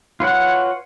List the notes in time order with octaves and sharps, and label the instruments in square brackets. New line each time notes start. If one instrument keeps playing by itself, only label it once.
[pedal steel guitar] F4 B4 C#5 F#5